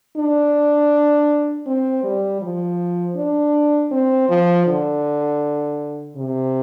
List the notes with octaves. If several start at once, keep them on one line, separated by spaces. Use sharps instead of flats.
D4
C4
G3
F3
D4
C4
F3
D3
C3